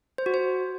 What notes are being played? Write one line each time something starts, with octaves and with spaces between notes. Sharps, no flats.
C5
F#4
C5